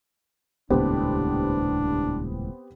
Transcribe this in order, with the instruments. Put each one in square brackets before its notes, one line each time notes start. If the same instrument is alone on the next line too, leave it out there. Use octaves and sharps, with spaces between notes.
[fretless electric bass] D#1 C#2 A2 [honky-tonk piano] B3 C4 G4 [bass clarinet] D4